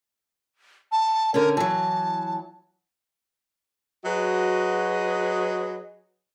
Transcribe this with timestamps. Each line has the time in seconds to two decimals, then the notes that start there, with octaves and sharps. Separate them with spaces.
0.92 A5
1.34 D3 C#4 A#4
1.57 E3 F#3 A5
4.05 F#3 F#4 G#4 B4 D#5